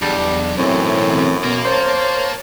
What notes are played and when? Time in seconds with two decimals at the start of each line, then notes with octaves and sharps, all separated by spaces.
0.02 B1 E2 G3 D4
0.57 F#2 A2 E3 C4
1.44 B2 A#3
1.65 C5 C#5 A5 A6